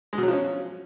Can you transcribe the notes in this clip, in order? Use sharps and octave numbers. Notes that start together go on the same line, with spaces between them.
G#3
B2
F#3
F3
C#4